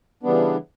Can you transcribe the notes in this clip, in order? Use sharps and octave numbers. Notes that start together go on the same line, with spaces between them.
C#3 E3 G3 B3 D4